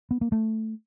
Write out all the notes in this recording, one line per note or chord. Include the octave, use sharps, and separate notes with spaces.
B3
A#3
A3